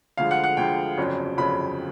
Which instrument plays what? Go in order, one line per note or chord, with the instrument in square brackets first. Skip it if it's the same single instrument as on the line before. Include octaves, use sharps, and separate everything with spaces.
[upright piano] D2 D3 F3 G#3 F5
F#5
F#5
D2 D3 F3 G#3 G5
G1 F2 C#3 F#3
G1 F2 C#3 F#3 B5